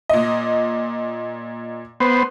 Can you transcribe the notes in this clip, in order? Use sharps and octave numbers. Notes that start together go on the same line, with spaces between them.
A#2 D#5
B3 C5